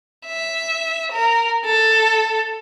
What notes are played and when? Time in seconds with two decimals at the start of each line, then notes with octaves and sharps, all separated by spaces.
0.27 E5
1.12 A#4
1.65 A4